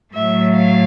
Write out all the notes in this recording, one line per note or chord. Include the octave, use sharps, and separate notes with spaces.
A2 F#3 A3 E5
F5